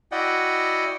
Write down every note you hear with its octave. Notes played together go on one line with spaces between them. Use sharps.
E4 F#4 D5 D#5 F#5 G5